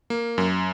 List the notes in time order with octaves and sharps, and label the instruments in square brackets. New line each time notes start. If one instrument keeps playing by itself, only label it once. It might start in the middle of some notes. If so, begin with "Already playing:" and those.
[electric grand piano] A#3
F#2